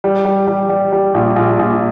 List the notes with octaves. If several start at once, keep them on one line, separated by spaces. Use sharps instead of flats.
G3
G3
G3
G3
G3
A#1
A#1
A#1